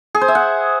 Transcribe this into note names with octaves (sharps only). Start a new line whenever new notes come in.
G#4
C5
E5
F#5